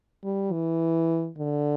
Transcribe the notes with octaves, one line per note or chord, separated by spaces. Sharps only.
G3
E3
D3